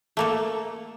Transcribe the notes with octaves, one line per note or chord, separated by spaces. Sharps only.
A3 A#3 A4